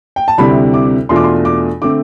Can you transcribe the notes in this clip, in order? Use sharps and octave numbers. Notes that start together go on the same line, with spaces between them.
G5
A5
D2 C3 G3 C4 E4 B5
D6
E2 B2 A3 D4 F4 C6
D6
C6
D6
D3 A3 C4 D6